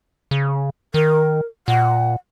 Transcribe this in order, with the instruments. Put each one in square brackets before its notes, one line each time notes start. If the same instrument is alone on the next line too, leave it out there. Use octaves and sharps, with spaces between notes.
[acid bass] C#3
[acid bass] D#3 [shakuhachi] A#4
[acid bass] A#2 [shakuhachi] F#5